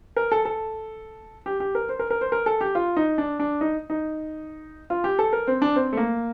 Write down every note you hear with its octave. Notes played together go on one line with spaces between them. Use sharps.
A#4
A4
A4
G4
G4
A#4
C5
A#4
A#4
C5
A#4
A4
G4
F4
D#4
D4
D4
D#4
D#4
F4
G4
A4
A#4
C4
D4
C4
A3
A#3